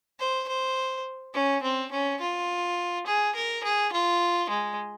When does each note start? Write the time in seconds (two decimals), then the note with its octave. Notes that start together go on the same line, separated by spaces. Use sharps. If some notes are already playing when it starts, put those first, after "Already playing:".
0.20 C5
0.48 C5
1.34 C#4
1.63 C4
1.92 C#4
2.21 F4
3.07 G#4
3.35 A#4
3.64 G#4
3.93 F4
4.50 G#3